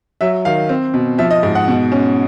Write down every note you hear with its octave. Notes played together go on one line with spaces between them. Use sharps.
F#3 E5
D#3 F5
C4
B2
F3 E5
D#5
G#2
F#5
B2
C#4